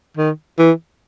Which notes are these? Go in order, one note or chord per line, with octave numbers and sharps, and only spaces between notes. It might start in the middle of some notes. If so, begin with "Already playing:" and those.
D#3
E3